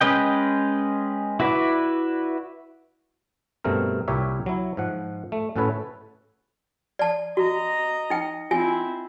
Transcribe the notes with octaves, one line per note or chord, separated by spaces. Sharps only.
G#3 C#4 B4 D#5 G5
E4 F#4 B4 D5
G2 B2 A3 C4 A#4
C2 A#2 G4 A#4 C#5 E5
F#3 E4
G#2 F3 F#5
A3
A2 C#4 F#4 A4 B4 C#5
D5 A5
F#4 D#5 A#5
D#4 G5
C4 E4 F4 G#5